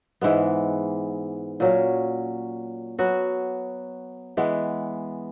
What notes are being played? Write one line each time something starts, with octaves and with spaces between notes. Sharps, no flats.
G#2 E3 G#3 B3
A#2 F#3 C#4
F#3 B3 F#4
E3 G#3 B3